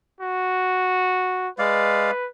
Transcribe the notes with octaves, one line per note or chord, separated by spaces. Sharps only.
F#4
G#3 B4 D5 F5